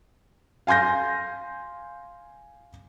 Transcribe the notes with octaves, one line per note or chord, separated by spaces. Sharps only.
F5 G#5 C6 G6 A#6